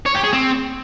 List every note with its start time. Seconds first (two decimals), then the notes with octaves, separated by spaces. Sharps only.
0.06 C#5
0.15 G4
0.24 G#4
0.33 C4